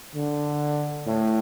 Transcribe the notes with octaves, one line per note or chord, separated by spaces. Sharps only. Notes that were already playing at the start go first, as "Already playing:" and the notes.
D3
A2